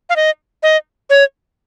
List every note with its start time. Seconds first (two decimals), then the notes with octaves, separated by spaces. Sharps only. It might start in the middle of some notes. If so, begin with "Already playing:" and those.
0.10 F5
0.16 D#5
0.63 D#5
1.10 C#5